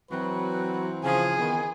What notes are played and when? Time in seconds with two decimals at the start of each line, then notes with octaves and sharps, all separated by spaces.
0.11 E3 F#3 C4 F#4 B4
1.04 C#3 F3 G#4
1.39 D#3 B3